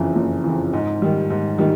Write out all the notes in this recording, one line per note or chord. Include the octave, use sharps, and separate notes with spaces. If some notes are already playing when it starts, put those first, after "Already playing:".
Already playing: F#1 F2 C#3 E3
F#1
F2 C#3 E3
G#2
D#3 G3
G#2
D#3 G3